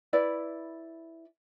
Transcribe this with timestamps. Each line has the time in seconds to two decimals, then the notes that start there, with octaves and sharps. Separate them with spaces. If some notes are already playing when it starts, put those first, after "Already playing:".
0.13 E4 B4 D5